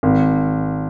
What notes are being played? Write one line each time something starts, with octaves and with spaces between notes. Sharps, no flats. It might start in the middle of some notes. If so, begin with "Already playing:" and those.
G#1